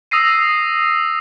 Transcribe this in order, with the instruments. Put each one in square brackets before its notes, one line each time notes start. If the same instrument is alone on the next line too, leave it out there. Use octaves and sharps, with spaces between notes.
[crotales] D#6 E6 A#6 C7 D#7